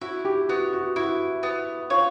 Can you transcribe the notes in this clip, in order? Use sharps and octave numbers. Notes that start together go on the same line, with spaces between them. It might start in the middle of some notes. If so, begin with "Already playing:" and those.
E4 F#4
G4
B3 F#4
F#4
E4 F#4
B3
F4 C#5